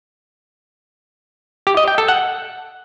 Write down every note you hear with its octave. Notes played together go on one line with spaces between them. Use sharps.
G4
D#5
G5
A4
F#5